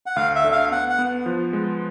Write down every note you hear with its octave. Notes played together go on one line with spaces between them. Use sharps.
F#5
D2 F5
E5
D3
F5
B3 F#5
F#5
B3
F3
G#3